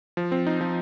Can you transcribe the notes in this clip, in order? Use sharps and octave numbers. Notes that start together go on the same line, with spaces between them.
F3
C4
D#4
F3